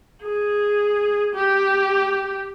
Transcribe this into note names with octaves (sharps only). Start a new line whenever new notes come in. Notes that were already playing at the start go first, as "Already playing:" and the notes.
G#4
G4